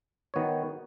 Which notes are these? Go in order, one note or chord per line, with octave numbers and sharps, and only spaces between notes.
D#3 B3 F#4 C#5